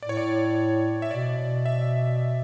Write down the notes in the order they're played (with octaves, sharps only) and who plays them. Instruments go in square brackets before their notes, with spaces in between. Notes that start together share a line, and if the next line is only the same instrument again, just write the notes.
[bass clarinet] A2 [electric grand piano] D5
[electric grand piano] C#5
D5
E5
[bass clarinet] B2 [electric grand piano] D5
[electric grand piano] E5